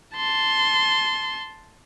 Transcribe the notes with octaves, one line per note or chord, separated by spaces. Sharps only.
A5 C6